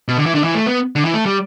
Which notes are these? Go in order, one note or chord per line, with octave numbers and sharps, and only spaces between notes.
B2
D3
E3
D3
E3
A3
B3
D3
E3
A3
G3